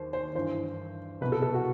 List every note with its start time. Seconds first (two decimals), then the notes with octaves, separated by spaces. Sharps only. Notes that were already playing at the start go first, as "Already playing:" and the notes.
Already playing: D#2 C5
0.13 C5
0.35 G2 E3 C5
1.21 C2 B2 B4
1.32 A4
1.42 A4
1.54 F#4